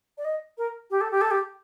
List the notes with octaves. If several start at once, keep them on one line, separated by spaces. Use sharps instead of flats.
D5
D#5
A#4
G4
A4
G4
A4
G4